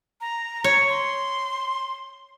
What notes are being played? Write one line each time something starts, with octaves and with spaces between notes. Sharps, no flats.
A#5
C#5
C6